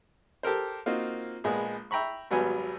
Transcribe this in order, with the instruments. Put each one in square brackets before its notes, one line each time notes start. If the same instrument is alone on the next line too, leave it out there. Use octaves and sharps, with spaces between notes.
[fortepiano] G4 A4 A#4 C5
A#3 C4 D#4 F4 F#4
A#1 G#3 B3 G#4
E5 G5 A#5 B5 C#6
G#1 F#3 G3 B3 G#5